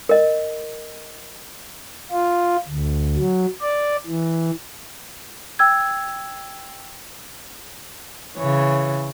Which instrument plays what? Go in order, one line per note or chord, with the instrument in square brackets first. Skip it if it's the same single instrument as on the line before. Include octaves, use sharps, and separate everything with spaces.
[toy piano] A#4 D#5
[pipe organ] F4
D2
F#3
D5
E3
[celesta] G5 E6 G#6
[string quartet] C#3 E3 C#5